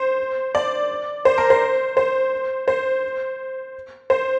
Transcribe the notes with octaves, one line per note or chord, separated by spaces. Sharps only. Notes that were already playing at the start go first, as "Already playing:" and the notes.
Already playing: C5
D5
C5
A#4
C5
C5
C5
C5